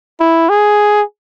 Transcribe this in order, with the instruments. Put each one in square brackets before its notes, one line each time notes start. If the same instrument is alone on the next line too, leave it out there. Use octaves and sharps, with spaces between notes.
[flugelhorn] E4
G#4